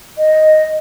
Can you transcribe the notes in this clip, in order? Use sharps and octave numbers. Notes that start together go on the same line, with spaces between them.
D#5